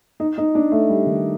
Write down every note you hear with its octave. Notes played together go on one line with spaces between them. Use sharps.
D#4
D#4
D4
A3
G3
D#3